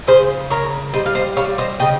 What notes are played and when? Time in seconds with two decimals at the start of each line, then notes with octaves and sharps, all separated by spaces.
0.07 C#3 G#4 C5
0.50 C#3 A#4 C#5
0.93 G3 C5 D#5
1.06 F5
1.15 C5 D#5
1.37 G3 C#5 F5
1.58 C5 D#5
1.79 C#3 D#5 G5